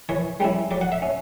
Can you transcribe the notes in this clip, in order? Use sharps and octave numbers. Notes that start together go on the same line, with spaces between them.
E3 C#5
G3 C#4 E4
F#3 D5
F#5
E5
C#4